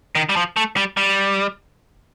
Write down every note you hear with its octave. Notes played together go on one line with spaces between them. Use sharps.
D#3
G3
F3
A3
G3
G3